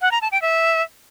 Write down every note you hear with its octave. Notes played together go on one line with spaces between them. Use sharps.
F#5
A#5
A5
G5
E5